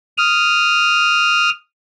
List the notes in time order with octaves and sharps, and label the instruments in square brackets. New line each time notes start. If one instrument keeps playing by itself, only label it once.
[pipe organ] D#6 F6